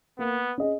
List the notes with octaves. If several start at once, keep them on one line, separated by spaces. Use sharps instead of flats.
A#3 B3
C#4 G#4 D#5